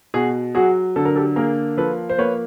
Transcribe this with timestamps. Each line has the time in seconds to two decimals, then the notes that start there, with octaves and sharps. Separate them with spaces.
0.14 B2 F#4 G#4
0.55 F#3 F#4 G#4
0.96 D3 A4
1.05 A#4
1.16 G4 A4
1.36 A#3 G#4 A#4
1.77 F3 A4 B4
2.10 C5
2.18 A#3 B4 C#5